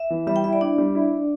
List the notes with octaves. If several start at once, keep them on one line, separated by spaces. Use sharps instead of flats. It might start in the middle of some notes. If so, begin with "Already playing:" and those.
Already playing: E5
E3
G3 E5
G5
E4 E5
D5
D4 E4
G3
E4